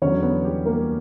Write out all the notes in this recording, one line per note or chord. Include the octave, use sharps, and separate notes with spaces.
E2 D3 F#3 C#4 C#5
B3 B4
G3 G4
A#3 A#4